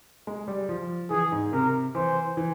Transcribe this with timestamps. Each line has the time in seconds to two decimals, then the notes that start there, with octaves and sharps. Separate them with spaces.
0.27 G#3
0.48 G3
0.69 F3
1.11 E3 G#4
1.32 G#2
1.53 C3 A#4
1.95 E3 C5
2.37 E3